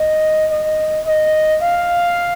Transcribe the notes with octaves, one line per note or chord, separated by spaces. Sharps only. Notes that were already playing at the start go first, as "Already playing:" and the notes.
Already playing: D#5
D#5
D#5
F5